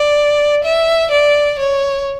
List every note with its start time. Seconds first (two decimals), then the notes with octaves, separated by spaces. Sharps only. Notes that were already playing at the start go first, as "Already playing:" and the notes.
Already playing: D5
0.64 E5
1.11 D5
1.59 C#5